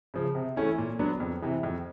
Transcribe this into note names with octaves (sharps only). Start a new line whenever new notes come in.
C#3 F3
C3
E3 A3 C#4 E4
A#2
F#3 B3 D4
F2
C3 E3
F2